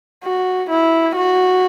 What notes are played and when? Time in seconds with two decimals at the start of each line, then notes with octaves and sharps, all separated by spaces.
0.24 F#4
0.70 E4
1.16 F#4